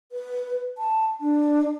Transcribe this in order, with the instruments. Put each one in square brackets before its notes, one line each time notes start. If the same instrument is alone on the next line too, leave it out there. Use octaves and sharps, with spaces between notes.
[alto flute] B4
A5
D4